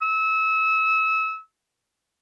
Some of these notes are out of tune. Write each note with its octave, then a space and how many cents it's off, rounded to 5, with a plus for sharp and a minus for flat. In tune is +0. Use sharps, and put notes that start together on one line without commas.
E6 -30